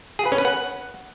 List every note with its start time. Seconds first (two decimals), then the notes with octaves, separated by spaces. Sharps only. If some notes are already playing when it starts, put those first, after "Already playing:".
0.19 G#4
0.26 B4
0.32 C#4
0.38 B4
0.45 F#5